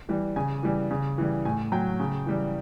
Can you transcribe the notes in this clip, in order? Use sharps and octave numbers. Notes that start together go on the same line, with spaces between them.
E3 G3
C#3 G#5
E3 G3
C#3
E3 G3
A2 G#5
F#3 G5
C#3
E3 G3